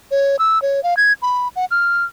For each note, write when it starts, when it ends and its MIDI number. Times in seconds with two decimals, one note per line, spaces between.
0.11 0.36 73
0.39 0.61 88
0.62 0.83 73
0.83 0.94 77
0.97 1.13 92
1.22 1.48 83
1.56 1.65 78
1.71 2.04 89